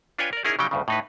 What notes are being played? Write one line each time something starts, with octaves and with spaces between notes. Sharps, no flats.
D4 F4 B4 C#5 G5 G#5
A#4 D5
C#4 D#4 E4 G#4 A#4
C#3 F#3 G3 D#4 G5
D2 G2 C#3
A2 D#4 B4